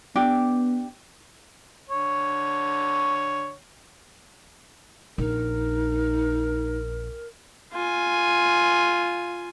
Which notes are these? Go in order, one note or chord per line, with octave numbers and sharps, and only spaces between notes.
B3 D4 G4
D3 C#5
A#1 D#4 A#4
F4 G#5